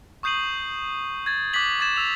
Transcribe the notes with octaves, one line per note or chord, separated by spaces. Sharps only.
C#6 D#6 G6 C7 D#7 F#7
G#6 A6
D6 F#6 A6 B6 F#7
D6 G#6 A6 E7
D6 E6 F7